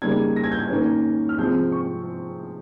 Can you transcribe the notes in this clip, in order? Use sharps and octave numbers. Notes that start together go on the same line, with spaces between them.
C#3 G3 A#3 D#4 G#6
A#6
G#6
G6
G#6
D#3 A#3 C#4
F6
C3 F3 G#3 C4 G6
C#6